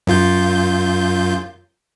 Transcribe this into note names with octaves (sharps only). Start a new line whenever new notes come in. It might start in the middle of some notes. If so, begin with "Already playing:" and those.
F#2 F4 G6